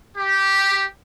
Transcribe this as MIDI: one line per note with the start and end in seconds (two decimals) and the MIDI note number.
0.17 0.84 67